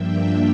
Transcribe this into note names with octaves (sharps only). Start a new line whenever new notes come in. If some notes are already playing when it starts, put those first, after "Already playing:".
Already playing: G2 F3 A#3 D4 E5 G5